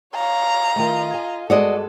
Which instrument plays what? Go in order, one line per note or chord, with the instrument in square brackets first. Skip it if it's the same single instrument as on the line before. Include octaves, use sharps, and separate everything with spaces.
[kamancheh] C#5 F5 [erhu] A#5
[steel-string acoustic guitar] D#3 A3 [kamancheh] F4 D#5
[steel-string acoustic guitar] G#5
[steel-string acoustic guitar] G2 G#3 B3 [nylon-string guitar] F#4 D5 D#5 [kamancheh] A4